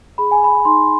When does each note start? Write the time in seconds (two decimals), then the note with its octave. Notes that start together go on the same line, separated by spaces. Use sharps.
0.18 G#4 B5
0.31 G#5
0.44 B5
0.65 D#4 C6